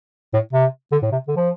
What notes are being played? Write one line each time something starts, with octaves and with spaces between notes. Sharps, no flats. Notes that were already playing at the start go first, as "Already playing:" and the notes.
A2
C3
D3
A2
C3
D3
F3